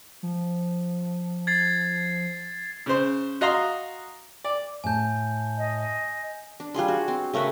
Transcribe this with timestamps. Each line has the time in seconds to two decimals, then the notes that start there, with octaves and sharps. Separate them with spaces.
0.23 F3
1.47 G#6 A6 C7
2.86 C#3 C5
3.41 F#4 D#5 F5 A#5 C6
4.44 D5
4.84 A2 G#5 A5 G6
5.58 D#5
6.60 D4
6.74 G3 F4 G#4 C6
6.88 F#4
7.08 C4
7.34 C#3 A3 A#4 B4